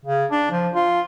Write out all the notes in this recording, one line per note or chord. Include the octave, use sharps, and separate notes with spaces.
C#3
D4
F3
F4